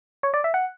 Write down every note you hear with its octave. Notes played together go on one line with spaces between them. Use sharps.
C#5
D5
E5
F#5